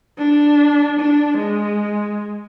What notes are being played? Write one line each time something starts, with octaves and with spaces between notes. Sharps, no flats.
D4
D4
G#3